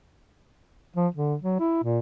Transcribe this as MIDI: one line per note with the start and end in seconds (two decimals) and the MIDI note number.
0.96 1.07 53
1.15 1.35 50
1.42 1.58 54
1.59 1.83 64
1.84 1.99 46